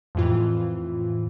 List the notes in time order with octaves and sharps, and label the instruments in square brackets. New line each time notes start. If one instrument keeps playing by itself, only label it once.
[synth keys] F2 A2 E3 F4